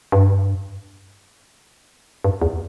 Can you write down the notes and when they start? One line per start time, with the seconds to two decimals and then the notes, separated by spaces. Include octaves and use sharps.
0.12 G2
2.24 G2
2.42 E2